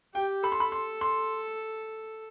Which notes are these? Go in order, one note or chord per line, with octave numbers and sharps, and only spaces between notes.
G4 G5
A4 B5
C6
B5
C6
C6